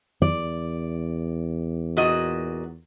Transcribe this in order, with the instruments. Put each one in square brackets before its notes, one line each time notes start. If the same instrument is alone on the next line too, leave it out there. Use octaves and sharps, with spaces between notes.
[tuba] E2 [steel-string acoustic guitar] D5
[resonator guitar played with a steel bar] A#2 F#4 D#5